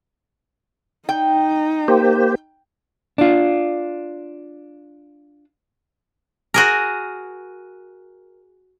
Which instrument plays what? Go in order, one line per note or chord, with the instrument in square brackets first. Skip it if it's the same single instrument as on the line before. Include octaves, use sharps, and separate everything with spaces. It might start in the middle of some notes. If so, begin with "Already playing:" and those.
[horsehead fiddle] D#4 [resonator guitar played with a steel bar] G5
[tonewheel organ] A#3 G4 C5
[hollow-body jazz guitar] D4 F4
[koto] F#4 G#4 A#4